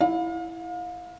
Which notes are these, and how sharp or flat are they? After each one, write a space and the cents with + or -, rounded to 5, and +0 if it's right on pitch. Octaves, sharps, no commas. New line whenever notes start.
E4 +0 F5 +35